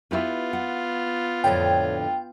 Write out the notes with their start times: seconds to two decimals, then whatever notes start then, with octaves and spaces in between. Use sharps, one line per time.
0.11 B3 E4 F4 G4 B4
0.53 F#5
1.44 F2 A2 D3 C#5 G5